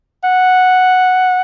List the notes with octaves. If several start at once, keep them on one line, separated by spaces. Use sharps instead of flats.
F#5